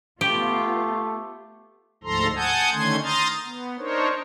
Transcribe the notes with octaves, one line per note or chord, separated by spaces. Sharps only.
A3 B3 F4 G4
D2 G#2 F3 A4 A#5 C6
F#5 G#5 A5 D#6 G6 G#6
D3 D#3 A3 C#4 C6 G#6
A#5 C6 D#6 F6 G6 A6
B3
D4 D#4 A#4 C5 C#5